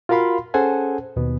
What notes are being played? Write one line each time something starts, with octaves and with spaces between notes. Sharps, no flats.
F4 F#4 A#4 F5 B5 C6
C#4 G#4 A4 C5 F#5 G#5
D#2 B2 B3